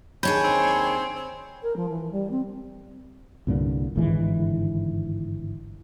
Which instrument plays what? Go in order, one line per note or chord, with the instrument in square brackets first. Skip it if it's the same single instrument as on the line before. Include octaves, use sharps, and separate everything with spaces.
[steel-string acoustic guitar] D#2 D4 G#4 [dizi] C#5 [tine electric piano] B5 G6
[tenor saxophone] C4
C4
[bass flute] A#4
F3
E3
G3
C4
[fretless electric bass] C2 G2 A#2 D3
G1 G#2 D#3 E3